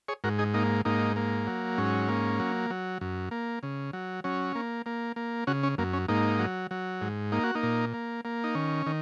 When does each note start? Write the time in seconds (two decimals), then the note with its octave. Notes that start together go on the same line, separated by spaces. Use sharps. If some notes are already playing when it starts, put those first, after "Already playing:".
0.08 G#4 C#5
0.24 G#2 F#4 A#4
0.39 D#4 G#4
0.54 A#3 D#4
0.85 G#2 A#3 D#4
1.16 A#3
1.47 F#3
1.78 G#2 C#4
2.09 A#3
2.39 F#3
2.70 F#3
3.01 F#2
3.31 A#3
3.63 C#3
3.93 F#3
4.24 F#3 C#4
4.55 A#3
4.86 A#3
5.16 A#3
5.47 C#3 C#4 F#4
5.63 C#4
5.78 F#2 A#3
5.93 C#4
6.08 G#2 A#3 D#4
6.39 F#3
6.71 F#3
7.01 G#2
7.32 A#3 D#4
7.43 F#4
7.55 A#3 D#4
7.63 A#2
7.94 A#3
8.25 A#3
8.44 D#4
8.55 D#3 C#4
8.86 D#3